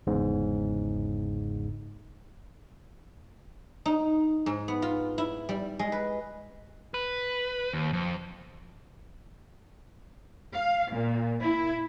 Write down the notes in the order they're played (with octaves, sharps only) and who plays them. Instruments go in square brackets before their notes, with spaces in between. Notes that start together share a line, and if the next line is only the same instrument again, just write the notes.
[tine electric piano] G1 E2 G#2 C#3
[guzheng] D#4
G#2
B3
F4
E4
G3
G#3
B4
[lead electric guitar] B4
D#2
F2
[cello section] F5
A#2
E4